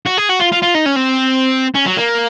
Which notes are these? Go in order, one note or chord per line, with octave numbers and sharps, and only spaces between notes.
F#4
G#4
F#4
F4
F4
F4
D#4
C#4
C4
C#4
F#3
A#3